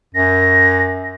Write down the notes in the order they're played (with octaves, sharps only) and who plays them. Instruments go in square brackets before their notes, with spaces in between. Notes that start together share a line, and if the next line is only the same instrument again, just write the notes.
[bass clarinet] F#2 [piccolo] A#6